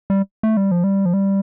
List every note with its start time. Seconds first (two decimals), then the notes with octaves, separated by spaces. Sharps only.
0.10 G3
0.43 A3
0.57 G3
0.71 F3
0.84 G3
1.06 F3
1.13 G3